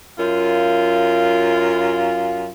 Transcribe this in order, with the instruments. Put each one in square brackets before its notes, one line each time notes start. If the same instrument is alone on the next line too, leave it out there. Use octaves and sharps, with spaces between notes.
[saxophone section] F#2 F4